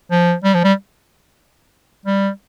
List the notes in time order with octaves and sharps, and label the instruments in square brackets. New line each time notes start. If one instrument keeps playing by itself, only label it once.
[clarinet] F3
G3
F3
G3
G3